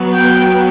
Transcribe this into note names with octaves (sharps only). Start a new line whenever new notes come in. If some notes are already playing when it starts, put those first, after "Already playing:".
Already playing: F#3 B3
G5